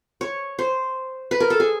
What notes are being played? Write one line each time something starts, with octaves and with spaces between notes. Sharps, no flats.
C#5
C5
B4
A#4
A4
G#4